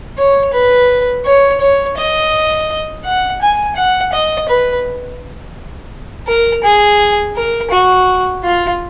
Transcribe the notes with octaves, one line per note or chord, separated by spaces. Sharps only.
C#5
B4
C#5
C#5
D#5
F#5
G#5
F#5
D#5
B4
A#4
G#4
A#4
F#4
F4